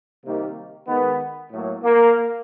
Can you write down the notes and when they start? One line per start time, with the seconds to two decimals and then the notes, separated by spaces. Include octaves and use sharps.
0.25 C3 D#3 G3 A#3
0.88 D#3 G#3 B3
1.52 A2 F#3 A#3
1.83 A#3